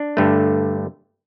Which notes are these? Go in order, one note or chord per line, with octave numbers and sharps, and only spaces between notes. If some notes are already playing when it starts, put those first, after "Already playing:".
Already playing: D4
G2 D3 A3